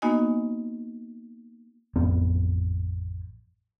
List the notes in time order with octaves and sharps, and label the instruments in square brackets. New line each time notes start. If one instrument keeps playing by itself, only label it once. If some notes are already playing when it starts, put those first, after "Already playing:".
[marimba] A#3 B3 D#4 F#4 D#5 G#5
[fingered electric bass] A1 F2 B3 C4